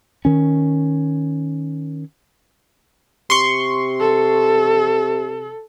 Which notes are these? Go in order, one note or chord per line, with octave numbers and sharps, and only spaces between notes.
D#3 C#4
C3 C6 C#6
A4